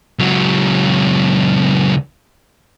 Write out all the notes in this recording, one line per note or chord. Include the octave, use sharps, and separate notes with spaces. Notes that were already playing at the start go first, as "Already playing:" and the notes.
C#2 F#3